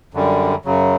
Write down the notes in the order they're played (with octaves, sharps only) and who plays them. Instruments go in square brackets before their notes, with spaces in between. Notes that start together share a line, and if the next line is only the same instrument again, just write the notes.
[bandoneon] F#2 D3 G3
F#2 C#3 F#3